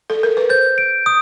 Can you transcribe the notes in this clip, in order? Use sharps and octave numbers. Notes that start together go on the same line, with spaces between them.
A4
A#4
B4
C5 G6
D7
D#6